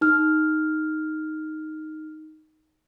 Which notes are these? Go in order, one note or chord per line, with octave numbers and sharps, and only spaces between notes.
D#4 F6